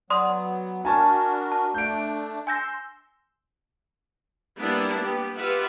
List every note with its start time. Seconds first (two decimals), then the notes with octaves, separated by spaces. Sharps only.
0.10 F#3 B3 D5 C6 D#6
0.85 D4 F#4 A#4 G#5 A5 C#6
1.52 A5
1.74 A3 D4 G6 D7
2.47 G#5 C6 E6 G6 A#6
4.59 G3 A#3 B3 D4 E4
5.00 G3 B3 G4
5.37 F4 G4 B4 E5 F#5